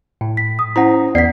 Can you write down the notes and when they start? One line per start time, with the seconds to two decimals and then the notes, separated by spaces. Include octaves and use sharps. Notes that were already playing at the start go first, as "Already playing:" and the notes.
0.21 A2
0.37 B6
0.59 D#6
0.76 C#4 E4 C5 F#5 A#5
1.15 E2 B3 D5 F#5 B6 C7